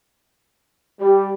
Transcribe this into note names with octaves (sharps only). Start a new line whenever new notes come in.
G3 G4